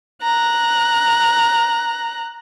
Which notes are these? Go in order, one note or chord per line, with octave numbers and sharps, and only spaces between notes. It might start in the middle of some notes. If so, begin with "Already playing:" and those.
A#5 F#6